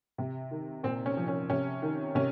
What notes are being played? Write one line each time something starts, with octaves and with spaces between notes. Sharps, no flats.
C3
D#3
A#2 C4
C#4
F3
C#4
C3 C#4
D#3
C3 C#4